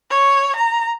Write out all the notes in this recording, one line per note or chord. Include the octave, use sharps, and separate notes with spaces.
C#5
A#5